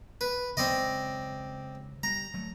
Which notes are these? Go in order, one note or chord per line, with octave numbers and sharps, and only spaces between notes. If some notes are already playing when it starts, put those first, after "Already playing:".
B4
C#3 F#3 G#3 C4 D5 D#5
G3 A#5
F#3 A3